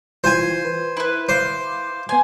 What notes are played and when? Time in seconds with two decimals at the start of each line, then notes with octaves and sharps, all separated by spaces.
0.24 E3 F4 C5 G#5
0.65 B4
0.97 E4 B4 B5
1.29 C5 F5 D6
2.09 B3 G#5 C6